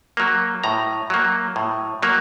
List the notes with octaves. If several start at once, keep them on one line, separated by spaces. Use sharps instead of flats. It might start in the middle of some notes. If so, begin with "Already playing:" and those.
F#3 A#3
A2 A#5
F#3 A#3
A2
F#3 A#3